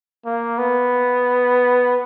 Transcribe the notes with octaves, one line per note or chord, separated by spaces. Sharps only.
A#3
B3